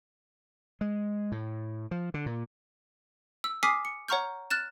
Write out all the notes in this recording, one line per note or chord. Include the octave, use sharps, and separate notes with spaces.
G#3
A2
F3
D3
A#2
E6
G#5 D6 D#6 F6 B6 C7
C#7
C#5 F#5 A#5 C#6 F6 G6
F6 F#6 A6 E7